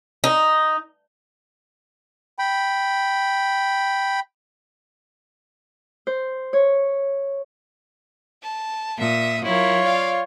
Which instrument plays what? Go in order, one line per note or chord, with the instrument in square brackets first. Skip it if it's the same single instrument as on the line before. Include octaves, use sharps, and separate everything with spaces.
[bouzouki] D#4
[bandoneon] G5 B5
[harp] C5
C#5
[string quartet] A5
A#2 E5 D#6
[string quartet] F#3 E4 A#4 [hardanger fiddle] F4 C#5
[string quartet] D5 F5